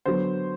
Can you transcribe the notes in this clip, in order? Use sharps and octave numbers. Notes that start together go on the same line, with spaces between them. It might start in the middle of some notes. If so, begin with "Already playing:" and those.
D3 F#3 B3 C5